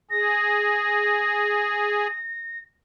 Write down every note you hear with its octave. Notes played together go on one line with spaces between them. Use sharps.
G#4 A#6